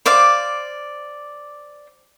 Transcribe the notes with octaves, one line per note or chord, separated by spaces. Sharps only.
C5 D5 F5 D6